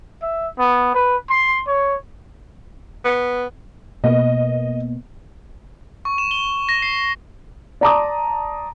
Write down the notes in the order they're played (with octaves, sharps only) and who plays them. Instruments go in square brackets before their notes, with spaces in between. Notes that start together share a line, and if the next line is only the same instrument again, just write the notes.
[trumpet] E5
B3
B4
C6
C#5
[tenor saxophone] B3
[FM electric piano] B2 A#3 B3 [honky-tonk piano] D#5
[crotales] C#6
E7
G7
A#6
C7
[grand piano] D5 A5 A#5 C6 D6 D#6